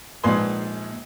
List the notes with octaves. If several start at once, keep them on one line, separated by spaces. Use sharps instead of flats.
A#1 G#2 F4 B4 G#5 C6